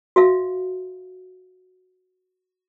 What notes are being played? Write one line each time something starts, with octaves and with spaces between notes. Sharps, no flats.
F#4 E5 F5